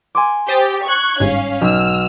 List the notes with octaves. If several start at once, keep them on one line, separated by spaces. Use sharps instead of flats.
G#5 C6 D6
G4 C5 D#6 A6
C#6 F#6 G#6
G1 G#2 C#4 F5
B1 E6 F6